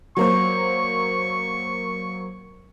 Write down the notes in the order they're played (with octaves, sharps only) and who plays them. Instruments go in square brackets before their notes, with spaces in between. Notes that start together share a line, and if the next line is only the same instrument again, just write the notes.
[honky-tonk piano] F#3 A#3 C5 [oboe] C#6